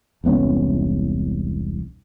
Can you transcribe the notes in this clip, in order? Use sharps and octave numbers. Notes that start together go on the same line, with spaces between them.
E1 C2 B3 C#4